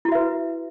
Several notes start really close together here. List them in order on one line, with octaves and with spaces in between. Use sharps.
E4 F#4 E5 B4